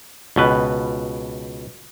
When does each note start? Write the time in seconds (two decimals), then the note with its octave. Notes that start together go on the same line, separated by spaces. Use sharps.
0.36 C#2 B2 B4